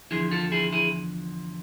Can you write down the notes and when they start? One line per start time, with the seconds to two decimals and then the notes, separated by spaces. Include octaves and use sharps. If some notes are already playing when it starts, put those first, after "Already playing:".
0.11 E2 D3 F3 E4 G#4
0.31 F4 A4
0.52 E4 G#4
0.73 E4 G#4